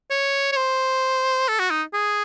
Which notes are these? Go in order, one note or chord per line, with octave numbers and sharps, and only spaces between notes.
C#5
C#5
C5
A4
F#4
D#4
G#4